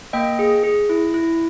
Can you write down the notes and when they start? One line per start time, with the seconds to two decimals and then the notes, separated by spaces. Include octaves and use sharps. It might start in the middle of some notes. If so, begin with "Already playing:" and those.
0.13 A#3 D#5 G5
0.39 G#4
0.64 G#4
0.89 E4
1.14 E4